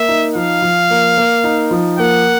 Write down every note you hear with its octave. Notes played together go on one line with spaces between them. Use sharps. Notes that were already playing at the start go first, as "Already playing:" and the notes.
Already playing: A#3 E5
D#4
F3 F5
F3
A#3
A#3
D#4
F3
A#3 F#5